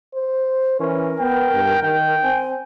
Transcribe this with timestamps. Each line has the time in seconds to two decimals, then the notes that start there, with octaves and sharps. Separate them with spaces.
0.14 C5
0.80 E3 C#4 A#4
1.20 B3 G5
1.55 G2
1.83 D#3 G5
2.23 C4 G#5